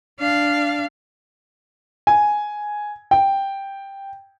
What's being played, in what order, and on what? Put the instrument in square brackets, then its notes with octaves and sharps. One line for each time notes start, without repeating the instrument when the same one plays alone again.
[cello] D4 F5
[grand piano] G#5
G5